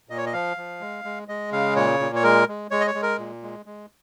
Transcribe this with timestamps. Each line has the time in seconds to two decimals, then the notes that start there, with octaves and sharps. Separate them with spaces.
0.09 A#2 D#5
0.17 C#5
0.26 D#5
0.33 F3 F5
0.57 F3
0.81 G#3
1.05 G#3
1.28 G#3 D#5
1.52 C#3 F5
1.76 A#2 C#5
2.00 A#2
2.15 C#5
2.24 G#3 A#4
2.48 G#3
2.71 G#3 C#5
2.80 D#5
2.87 C#5
2.95 G#3
3.02 A#4
3.19 A#2
3.43 G#3
3.66 G#3